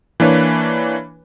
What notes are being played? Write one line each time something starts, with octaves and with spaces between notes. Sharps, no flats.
E3 A#3 D4 B4 C#5